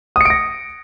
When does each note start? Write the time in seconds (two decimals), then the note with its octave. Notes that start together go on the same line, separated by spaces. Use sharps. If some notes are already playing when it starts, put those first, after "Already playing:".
0.16 D#6
0.21 C#7
0.25 D7
0.30 A#6